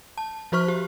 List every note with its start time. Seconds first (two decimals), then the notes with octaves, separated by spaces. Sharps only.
0.18 A5
0.52 F3 F#4 C5 C#6 F6
0.68 G4